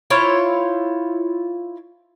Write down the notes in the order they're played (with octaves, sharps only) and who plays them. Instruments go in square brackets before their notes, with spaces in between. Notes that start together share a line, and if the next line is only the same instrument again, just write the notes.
[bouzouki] E4 F4 C5 C#5